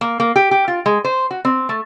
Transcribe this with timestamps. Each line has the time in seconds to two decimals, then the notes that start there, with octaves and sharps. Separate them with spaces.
0.01 A#3
0.20 A#3
0.36 G4
0.51 G4
0.68 F4
0.86 G#3
1.04 C5
1.31 F#4
1.45 C4
1.69 A3